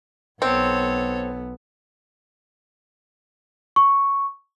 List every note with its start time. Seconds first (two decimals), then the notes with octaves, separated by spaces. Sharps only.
0.42 B1 B3 C4 A4 C#5
3.76 C#6